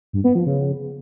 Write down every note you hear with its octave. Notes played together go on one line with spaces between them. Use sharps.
G2
B3
F3
C#3